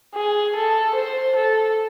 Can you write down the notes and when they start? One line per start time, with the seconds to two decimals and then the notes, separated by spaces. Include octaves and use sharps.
0.15 G#4
0.55 A4
0.95 C5
1.36 A4